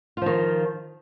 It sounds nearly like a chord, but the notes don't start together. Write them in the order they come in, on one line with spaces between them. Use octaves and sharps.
F4 F3 D#3